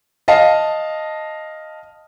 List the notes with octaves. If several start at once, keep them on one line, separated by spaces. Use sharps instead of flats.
D#5 F5 A5